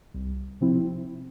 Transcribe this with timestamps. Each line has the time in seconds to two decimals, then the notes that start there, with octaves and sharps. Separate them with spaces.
0.14 C2
0.61 C3 F3 C4 E4